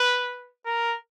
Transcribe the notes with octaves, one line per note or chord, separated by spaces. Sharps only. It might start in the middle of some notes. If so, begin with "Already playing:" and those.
Already playing: B4
A#4